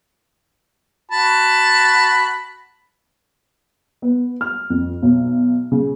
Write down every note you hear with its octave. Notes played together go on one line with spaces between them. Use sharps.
F#4 A5 B5
B3
F6
F2
B1
C#3